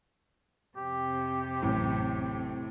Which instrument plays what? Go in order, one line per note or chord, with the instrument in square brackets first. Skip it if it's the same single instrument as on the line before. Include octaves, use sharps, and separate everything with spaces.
[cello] F2 C3 [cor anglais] G4
[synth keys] A1 F#2 [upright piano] A2